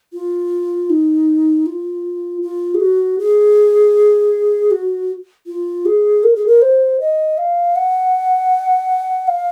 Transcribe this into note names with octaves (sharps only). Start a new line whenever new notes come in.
F4
D#4
F4
F4
G#4
F#4
G#4
F#4
F4
G#4
A#4
G#4
A#4
C5
D#5
F5
F#5
F5